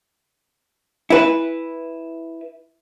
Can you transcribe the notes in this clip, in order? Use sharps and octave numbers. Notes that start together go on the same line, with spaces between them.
E4 B4